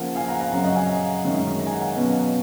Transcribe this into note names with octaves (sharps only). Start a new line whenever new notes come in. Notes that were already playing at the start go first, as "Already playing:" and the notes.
Already playing: C#3 F3 A#3 F#5
F5 G#5
F#5 A#5
F#5 A#5
F#2 C#3 F#3 C#4 F#5 A#5
D#5 F#5
F5 G#5
F#2 D#3 G#3 C#4
A#5
G#5
F#5
F5 G#5
B2 F#3 C#4